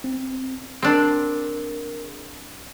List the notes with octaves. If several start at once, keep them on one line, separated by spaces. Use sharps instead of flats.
C4
C4 D4 G#4 A#4